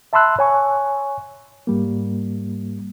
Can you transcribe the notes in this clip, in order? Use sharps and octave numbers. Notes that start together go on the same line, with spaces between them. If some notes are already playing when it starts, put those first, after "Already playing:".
E5 A5 B5 C6 E6 F#6
C#5 G#5 C#6
G#2 G3 A#3